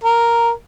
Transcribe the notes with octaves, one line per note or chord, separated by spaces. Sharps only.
A#4